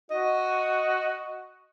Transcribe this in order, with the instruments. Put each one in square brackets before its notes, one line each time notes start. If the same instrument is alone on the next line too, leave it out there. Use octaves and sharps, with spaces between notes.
[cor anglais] F#4 [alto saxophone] D#5